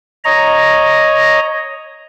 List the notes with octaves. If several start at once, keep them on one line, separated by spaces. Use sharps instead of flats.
C#5 D#5 A#5